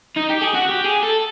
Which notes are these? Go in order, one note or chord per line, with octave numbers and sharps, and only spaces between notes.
D#4
G4
G#4
F#4
G4
G#4
A4